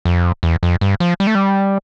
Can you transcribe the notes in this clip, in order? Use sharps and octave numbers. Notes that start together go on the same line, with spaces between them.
F2
E2
F2
G2
F3
G3
A3
G3